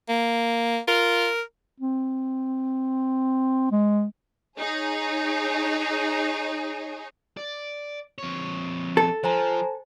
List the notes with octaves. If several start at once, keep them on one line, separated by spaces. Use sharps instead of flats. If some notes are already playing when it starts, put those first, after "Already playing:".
A#3
F4 A#4
C4
G#3
D#4 G#4 C#5
D5
F2 C#5
A4
F3 C5 G#5 A#5